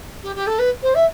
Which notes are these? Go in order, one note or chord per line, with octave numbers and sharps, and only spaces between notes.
G4
G4
A4
B4
C5
E5